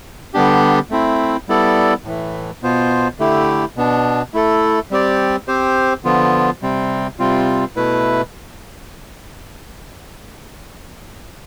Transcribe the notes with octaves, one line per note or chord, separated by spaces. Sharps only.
D3 G3 B3 D4 G4
A3 C4 E4
G3 B3 E4 A4 D5
A2 E3 A3
B2 B3 F4 C5
D3 A3 E4 G4
B2 B3 D4
A3 E4 A4
G3 C4 G4 D5
C4 G4 C5
D3 F3 B3 F4
C3 G3 C4
C3 G3 C4 F4
B2 A3 E4 B4